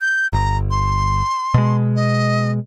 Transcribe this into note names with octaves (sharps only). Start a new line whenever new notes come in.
G6
G1 A#5
C6
B2 G#3
D#5